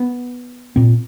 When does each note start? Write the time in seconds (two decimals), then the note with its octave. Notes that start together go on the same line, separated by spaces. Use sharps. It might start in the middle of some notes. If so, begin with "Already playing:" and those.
Already playing: B3
0.76 A#2 C4